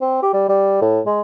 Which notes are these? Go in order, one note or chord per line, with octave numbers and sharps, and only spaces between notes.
C4
G4
G3
G3
A2
G#3